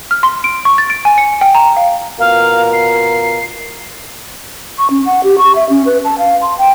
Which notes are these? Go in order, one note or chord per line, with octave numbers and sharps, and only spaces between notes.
F6
C6
D7
C#6
A6
D7
G#5
C#7
G5
A#5
F5
B2 F4 A#4 F5
C7
C#6
C#4
F#5
G4
C#6
E5
C#4
B4
A5
F5
C6
G5